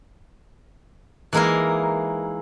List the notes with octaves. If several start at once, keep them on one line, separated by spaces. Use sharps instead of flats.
E3 G#3 A#3 D#4 E4 A#4